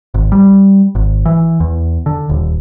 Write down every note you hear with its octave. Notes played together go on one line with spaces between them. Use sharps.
G#1
G3
G#1
E3
E2
D3
D#1